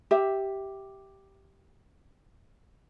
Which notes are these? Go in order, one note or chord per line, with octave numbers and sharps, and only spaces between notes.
G4 E5